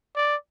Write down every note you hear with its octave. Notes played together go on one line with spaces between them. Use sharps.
D5